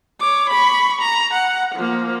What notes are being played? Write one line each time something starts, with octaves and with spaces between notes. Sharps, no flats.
C#5 D6
B5 C#6
A#5
F#5
F3 A#3